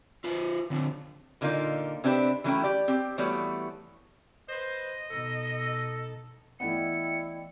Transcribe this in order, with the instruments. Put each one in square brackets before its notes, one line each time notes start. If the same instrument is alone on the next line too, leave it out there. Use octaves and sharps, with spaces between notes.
[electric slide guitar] F4 B4 C5
D3 C4 D4
[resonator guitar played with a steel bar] A#2 D3 A#3 D#4 F4
C3 C4 D4 G4 B4
E3 F#3 A3 C#4 E4 G5
G4 D5
C4 G4
E3 G3 A3 B3 F#4 C#5
[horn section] B4 C5 [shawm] D#5
[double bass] B2 [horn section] D#4 A4
[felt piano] E3 A3 B3 [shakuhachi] E4 [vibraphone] D5 D#5 G5 [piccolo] C#7